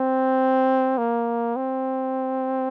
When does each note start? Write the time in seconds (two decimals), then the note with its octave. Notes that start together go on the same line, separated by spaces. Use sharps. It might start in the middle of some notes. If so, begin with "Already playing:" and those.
Already playing: C4
0.98 A#3
1.56 C4